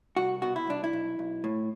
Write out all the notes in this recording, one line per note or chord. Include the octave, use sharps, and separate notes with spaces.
C2 F#4
B2 F#4
E4
C2 D4
E4
B1
B1
A2